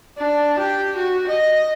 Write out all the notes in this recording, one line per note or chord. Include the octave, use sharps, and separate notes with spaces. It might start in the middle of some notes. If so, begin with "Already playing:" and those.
D4
G4
F#4
D#5